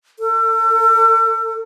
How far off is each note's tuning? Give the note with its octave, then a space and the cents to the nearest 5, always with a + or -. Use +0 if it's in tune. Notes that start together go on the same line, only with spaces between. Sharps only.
A4 +35